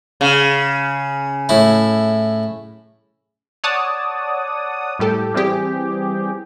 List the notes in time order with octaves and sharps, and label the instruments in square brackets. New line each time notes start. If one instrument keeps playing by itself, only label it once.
[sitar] C#3
[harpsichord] A2 E4
[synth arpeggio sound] C#5 D5 F#5 A5 D#6
A2 G3 G4 A4
E3 G3 C4 G4 G#4